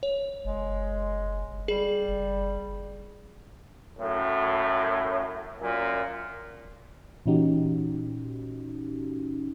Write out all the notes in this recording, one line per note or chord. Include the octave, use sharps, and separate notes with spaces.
C#5
F#1 G#3
G3 G#4
F#1
F#2 A2
F#2 A#2
A#2 E3 C#4 D#4 F#4 G4